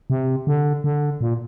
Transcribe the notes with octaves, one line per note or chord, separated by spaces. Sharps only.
C3
D3
D3
A#2